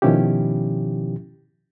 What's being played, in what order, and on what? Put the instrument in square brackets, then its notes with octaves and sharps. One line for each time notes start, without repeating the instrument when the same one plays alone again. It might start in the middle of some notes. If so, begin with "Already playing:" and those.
[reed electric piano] B2 D#3 F3 C#4 E4 G4